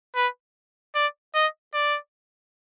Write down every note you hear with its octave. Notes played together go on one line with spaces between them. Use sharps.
B4
D5
D#5
D5